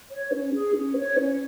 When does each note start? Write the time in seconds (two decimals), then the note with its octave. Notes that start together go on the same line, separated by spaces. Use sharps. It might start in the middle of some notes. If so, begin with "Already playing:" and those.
0.11 C#5
0.33 C#4
0.55 G#4
0.76 C#4
0.97 C#5
1.19 C#4